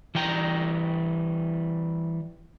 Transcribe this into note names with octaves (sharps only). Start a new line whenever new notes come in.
E3 G3 G5 A#5